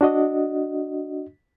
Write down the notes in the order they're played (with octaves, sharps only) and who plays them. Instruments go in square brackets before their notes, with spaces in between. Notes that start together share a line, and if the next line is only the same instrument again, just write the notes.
[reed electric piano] D4 F#4 D#5